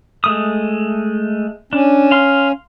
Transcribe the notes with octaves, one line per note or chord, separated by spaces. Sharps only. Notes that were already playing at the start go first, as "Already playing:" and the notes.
G#3 A3 D#6
C#4 D4
F5 C6